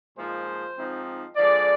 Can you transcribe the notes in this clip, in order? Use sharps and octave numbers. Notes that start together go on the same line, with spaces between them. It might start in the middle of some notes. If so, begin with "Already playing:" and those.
A#2 F3 G#3 D#4 C5
G#2 F3 C4 D#4
D3 F3 G#3 D5